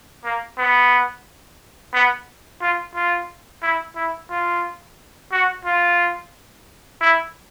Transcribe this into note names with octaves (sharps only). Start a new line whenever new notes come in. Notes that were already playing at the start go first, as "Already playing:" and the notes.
A#3
B3
B3
F4
F4
E4
E4
F4
F#4
F4
E4